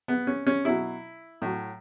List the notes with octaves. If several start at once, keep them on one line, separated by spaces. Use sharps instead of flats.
B3
C#4
C#4
B2 F#3 E4
A2 F#3